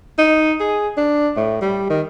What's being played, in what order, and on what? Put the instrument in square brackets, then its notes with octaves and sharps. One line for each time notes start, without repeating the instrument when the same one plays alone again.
[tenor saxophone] D#4
G#4
D4
A2
G3
D#3